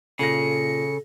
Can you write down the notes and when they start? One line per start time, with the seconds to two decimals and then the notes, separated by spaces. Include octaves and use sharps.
0.19 A#2 C#3 A4 A#6 C#7